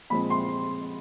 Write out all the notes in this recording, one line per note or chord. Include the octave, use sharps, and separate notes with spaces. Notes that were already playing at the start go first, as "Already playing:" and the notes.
A#2 F3 G#3 C4 B5
C6